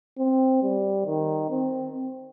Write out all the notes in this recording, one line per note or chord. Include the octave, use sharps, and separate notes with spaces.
C4
G3
D#3
C4